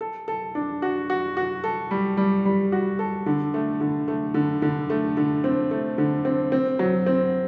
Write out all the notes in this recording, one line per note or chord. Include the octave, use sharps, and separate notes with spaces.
A4
A4
D4
F#4
F#4
F#4
A4
G3
G3
G3
F#4
A4
D3
A3
D3
A3
D3
D3
A3
D3
C4
A3
D3
C4
C4
F#3
C4